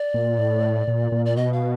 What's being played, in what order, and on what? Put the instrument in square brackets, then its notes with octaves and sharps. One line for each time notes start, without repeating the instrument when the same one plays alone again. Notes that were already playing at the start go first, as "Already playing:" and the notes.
Already playing: [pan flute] D5
[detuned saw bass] A#2
A2
A#2
A#2
[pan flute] D5
[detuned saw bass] B2 [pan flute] D#5
[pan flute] F5